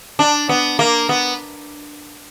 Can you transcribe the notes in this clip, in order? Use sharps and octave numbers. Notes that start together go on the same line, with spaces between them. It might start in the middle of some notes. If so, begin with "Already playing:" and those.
D4
B3
A#3
B3